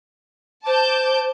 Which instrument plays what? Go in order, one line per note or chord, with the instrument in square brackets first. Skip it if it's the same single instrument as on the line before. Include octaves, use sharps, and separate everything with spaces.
[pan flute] C5 [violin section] A5 D6 G6